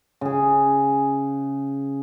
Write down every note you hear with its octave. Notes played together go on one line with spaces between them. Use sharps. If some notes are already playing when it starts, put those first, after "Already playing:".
C#3 G#4